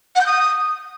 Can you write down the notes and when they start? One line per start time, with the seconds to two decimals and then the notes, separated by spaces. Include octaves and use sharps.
0.15 F#5
0.21 G6
0.26 D#6